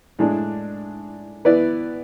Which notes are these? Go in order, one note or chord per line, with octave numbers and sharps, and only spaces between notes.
A2 G#3 D4
E3 B3 E4 B4 D5